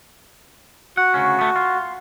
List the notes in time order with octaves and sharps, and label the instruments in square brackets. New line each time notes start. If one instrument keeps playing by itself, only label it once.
[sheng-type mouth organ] F#4 [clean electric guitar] F#5
[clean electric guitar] D2 C#3 C#4
A3 B3
F4